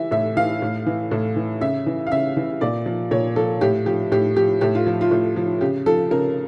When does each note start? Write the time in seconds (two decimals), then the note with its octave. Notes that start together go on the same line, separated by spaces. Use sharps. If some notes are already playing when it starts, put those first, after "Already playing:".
Already playing: E3 E5
0.11 A2 E5
0.36 E3 F5
0.62 A2
0.86 E3
1.11 A2
1.36 E3
1.61 C#3 E5
1.86 E3
2.07 F5
2.11 C#3 E5
2.37 E3
2.61 A#2 D5
2.86 F3
3.11 A#2 C#5
3.36 F3 A4
3.61 A2 G4
3.86 F3 G4
4.12 A2 G4
4.36 F3 G4
4.61 A2 G4
4.75 F4
4.87 F3
5.01 F4
5.11 A2
5.36 F3
5.61 C#3 G4
5.86 F3 A4
6.11 C#3 A#4